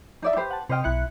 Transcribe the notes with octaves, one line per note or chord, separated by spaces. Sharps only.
D#4 D5 E5
G4 B4 C5
F#5 A5
C3 C5 D#5 G5 F6
B1 E4 F#6 C#7